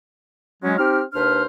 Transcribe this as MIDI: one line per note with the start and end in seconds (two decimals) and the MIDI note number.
0.63 0.77 54
0.63 0.77 56
0.63 0.77 61
0.78 1.01 60
0.78 1.01 63
0.78 1.01 67
0.78 1.01 89
1.13 1.44 39
1.13 1.44 62
1.13 1.44 71
1.13 1.44 72
1.13 1.44 89